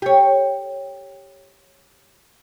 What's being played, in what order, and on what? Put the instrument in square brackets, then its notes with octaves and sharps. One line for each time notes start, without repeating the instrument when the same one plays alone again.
[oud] G4 C#5